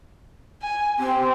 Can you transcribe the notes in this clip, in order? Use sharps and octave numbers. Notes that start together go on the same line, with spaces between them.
G#5
C4 G4